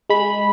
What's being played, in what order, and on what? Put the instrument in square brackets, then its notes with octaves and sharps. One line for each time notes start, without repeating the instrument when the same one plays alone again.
[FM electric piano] G#3 B5